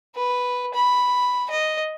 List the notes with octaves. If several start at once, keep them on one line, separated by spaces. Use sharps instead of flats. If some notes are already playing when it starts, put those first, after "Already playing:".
B4
B5
D#5